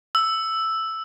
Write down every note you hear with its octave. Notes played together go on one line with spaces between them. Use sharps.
E6